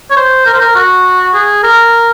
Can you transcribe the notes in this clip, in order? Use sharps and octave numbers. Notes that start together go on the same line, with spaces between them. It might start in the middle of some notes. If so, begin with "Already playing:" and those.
C#5
C5
A#4
C5
A#4
F#4
G#4
A#4